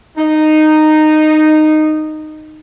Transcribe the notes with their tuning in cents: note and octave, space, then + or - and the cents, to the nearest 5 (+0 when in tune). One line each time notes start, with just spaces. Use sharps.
D#4 -10